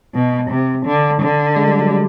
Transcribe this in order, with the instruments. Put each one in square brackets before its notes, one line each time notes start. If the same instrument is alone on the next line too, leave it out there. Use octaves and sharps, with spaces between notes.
[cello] B2
C3
D3
D3
[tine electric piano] G#3
G3
F#3
G3